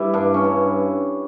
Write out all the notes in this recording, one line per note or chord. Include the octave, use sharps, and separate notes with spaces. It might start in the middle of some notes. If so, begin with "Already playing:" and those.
Already playing: G3 E4 B4
G2 D4
C#4
G2